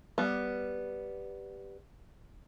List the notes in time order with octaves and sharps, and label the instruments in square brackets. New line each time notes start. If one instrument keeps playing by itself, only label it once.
[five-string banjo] G3 B3